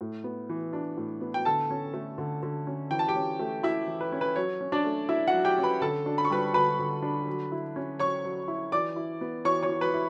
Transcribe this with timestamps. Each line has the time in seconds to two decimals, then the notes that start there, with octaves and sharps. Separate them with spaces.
0.01 A2
0.24 B3
0.49 E3
0.73 D4
0.97 A2
1.21 B3
1.34 G5
1.45 D3 A4 A5
1.71 C#4
1.94 A3
2.18 D3
2.43 D3
2.67 C#4
2.91 E3 G5
2.99 A5
3.08 G4 G5
3.15 C#4
3.39 A3
3.63 E4 E5
3.88 E3
4.01 B4
4.12 C#4
4.21 B4
4.36 F#3 C#5
4.61 C#4
4.72 D4 D5
4.85 A3
5.09 E4 E5
5.27 F#4 F#5
5.34 F#3
5.45 G4 G5
5.58 C#4
5.63 B4 B5
5.81 D3 A4 A5
6.06 D4
6.18 B5
6.25 C#6
6.30 G3 B4 B5
6.54 D3 B4 B5
6.79 D3
7.02 D4
7.27 F#3
7.52 E4
7.76 C#4
7.99 F#3 C#5 C#6
8.24 F#3
8.48 E4
8.72 E3 D5 D6
8.96 E4
9.21 B3
9.45 E3 C#5 C#6
9.63 C#5 C#6
9.69 E3
9.81 B4 B5
9.94 E4